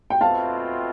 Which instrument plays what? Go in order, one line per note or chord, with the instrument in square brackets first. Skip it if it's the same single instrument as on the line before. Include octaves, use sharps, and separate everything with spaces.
[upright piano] G5
[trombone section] B2 A3 C4 F4 [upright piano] F5 A5